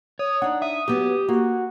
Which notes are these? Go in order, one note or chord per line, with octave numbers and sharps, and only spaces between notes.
C#5 D#6
D4 D#4 F#5
E5 D#6
F#3 B3 G4
A#3 F#4